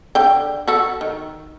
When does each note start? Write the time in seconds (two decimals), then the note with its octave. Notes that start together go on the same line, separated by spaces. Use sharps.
0.15 D3 G5
0.68 F#4 A4
1.01 D#3